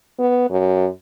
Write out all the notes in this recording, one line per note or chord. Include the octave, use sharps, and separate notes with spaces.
B3
F#2